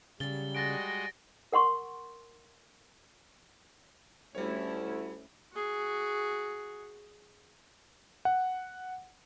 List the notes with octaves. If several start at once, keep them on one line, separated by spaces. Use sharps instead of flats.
C#3 F#3 G3 A6 G7
G#3 F#4 D#5 A6 A#6 D7
A#4 F#5 C6 C#6
D2 G3 A3 C#4 E4 C#5
F#4 G#4
F#5